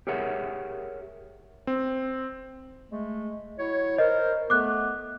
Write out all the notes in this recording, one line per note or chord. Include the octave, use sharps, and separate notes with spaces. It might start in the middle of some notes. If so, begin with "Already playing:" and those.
G4 G#4 A#4 C#5 E5 F#5
C4
G#3 A3
F#3 E4 C#5
A#4 C5 D#5
A3 B3 D6 F#6